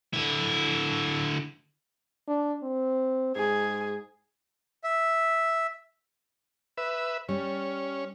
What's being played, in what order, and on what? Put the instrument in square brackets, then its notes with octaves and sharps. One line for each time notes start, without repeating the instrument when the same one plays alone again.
[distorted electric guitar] D3 E4
[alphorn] D4
C4
[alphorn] G#2 [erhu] G#4
[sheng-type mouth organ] E5
[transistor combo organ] B4 E5
[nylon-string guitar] G3 [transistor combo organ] C#4